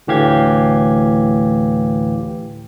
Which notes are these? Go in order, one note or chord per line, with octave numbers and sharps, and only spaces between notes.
D2 A2 E3 G4 F5 G#6